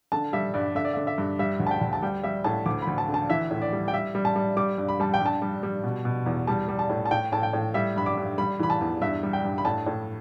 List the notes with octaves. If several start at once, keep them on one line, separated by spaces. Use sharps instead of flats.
D3 A5
G3 E5
G2 D5
D3 E5
D5
D3 E5
E5
G2
G3 E5
D2
A5
G5
D2
A5
G3 G5
G3 E5
A2 A5
D2 D6
D2 B5
A5
D3
A5
E3 E5
A2
D5
G3
G5
G3 E5
G3
A5
G3
G3 D6
G2
B5
G3 A5
G5
G2
A5
G3
G3
B2
B2
E2
G3 A5
G3
A5
A2
A5
A2 G5
A2 A5
G5
A2
G3 E5
G2 B5
D6
G2
G3 B5
E3 B5
A5
E2
G2 E5
G3
G5
G2
B5
A2 A5
A2